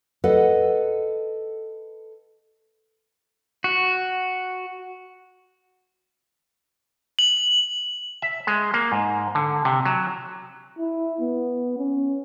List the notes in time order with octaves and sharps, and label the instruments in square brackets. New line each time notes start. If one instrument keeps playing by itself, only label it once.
[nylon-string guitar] A4 B4 D#5 F#5
[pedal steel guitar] F#4
[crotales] F#7
[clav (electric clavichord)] E5
G#3
A#3
G#2
D3
C3
F#3
[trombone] E4
B3
C#4